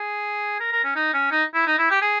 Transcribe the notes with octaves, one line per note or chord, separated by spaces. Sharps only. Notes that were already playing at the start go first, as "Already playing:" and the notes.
Already playing: G#4
A#4
A#4
C#4
D#4
C#4
D#4
E4
D#4
E4
G4
G#4